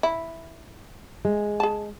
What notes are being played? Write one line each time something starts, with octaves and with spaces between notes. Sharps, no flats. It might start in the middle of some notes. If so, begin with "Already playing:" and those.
E4
G#3
G#4 A5